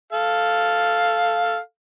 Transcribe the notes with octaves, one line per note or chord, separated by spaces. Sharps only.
A4 F5